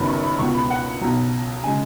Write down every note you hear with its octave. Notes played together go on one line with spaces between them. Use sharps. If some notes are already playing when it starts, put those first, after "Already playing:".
Already playing: F#1 F#2 D#3 F#3 B3 B5
C#6
B5
C#2 B2 B3 C#6
B5
F#5
B1 B2 F#3
C#3 G#3 G#5